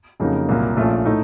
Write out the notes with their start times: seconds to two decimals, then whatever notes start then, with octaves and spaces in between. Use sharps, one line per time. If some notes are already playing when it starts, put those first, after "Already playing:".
0.20 F2 C#3 F#3 A#3 D#4
0.49 C2 A#2 F#3 A#3
0.77 A#1 A#2 A3 C#4 F4
1.05 A2 A3 D#4